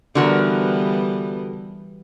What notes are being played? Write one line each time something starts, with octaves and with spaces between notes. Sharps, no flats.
D3 E3 G3 B3 F#4 A#4